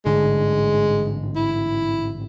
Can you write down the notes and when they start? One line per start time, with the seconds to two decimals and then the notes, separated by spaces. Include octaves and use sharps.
0.06 A1 G#2 D3 G#3
1.36 E4